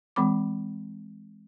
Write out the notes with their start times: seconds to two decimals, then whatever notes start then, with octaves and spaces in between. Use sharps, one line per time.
0.16 E3 G#3 C4 B5 D6